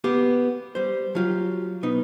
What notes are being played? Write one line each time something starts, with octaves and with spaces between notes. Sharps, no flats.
B3 G4 F5
G3 C5
F#3 F4 G4
B2 B3 D#4